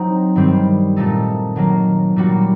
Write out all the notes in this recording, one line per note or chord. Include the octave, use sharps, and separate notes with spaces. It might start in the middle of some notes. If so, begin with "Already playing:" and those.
Already playing: F#3 C4 D#4 F#4
G2 D#3 G3 C4
A#2 A3 D#4 A4
D#3 F#3 A#3
A#2 G3 A#3 F#4